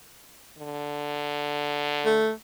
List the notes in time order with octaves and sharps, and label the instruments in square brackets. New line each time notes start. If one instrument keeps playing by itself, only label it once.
[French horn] D3
[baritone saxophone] A3